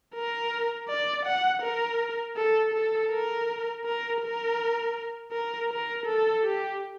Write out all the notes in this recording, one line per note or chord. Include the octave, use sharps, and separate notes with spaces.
A#4
D5
F#5
A#4
A4
A4
A#4
A#4
A#4
A#4
A#4
A4
G4